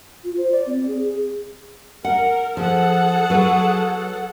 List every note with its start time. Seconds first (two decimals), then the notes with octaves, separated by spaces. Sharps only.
0.24 F4
0.38 C5
0.52 D5
0.67 C4
0.87 G#4
1.02 G#4
2.05 A#4 F#5
2.57 F3 G#4 A4 F#5
3.30 F#3 B4